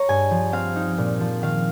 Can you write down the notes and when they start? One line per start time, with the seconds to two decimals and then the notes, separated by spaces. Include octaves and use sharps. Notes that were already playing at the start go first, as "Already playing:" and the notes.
Already playing: C#5 A#5
0.08 G2 G#5
0.31 F3
0.52 C4 F5
0.76 D#4
0.98 A#2
1.20 F3
1.42 D#3 F5